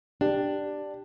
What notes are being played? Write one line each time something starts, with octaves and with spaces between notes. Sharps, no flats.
D4 G4